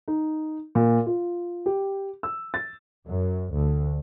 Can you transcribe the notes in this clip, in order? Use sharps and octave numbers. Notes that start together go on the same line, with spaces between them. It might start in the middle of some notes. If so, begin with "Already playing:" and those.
D#4
A#2
F4
G4
E6
A6
F#2
D2